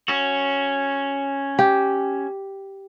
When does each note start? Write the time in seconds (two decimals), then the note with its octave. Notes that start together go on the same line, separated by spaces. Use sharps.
0.08 C#4 F#4
1.59 G4